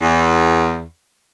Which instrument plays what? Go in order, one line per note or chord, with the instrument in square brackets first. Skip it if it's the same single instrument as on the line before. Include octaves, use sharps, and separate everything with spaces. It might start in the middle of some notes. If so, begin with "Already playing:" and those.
[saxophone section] E2